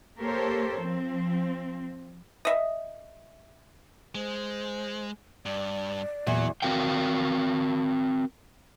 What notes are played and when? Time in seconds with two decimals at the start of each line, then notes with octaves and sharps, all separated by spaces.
0.18 A#3 G4 A4 A#4 C5 C#5
0.76 F3 C4
2.45 D#5 E5
4.15 G#3 C5
5.46 G2 D5
6.27 E2 A#2 F#3
6.62 C4 F#4 A#4 F5 G5